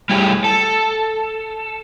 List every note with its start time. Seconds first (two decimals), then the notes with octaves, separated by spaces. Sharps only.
0.09 G3 A3 E4 G4 G#4 C#5
0.44 A4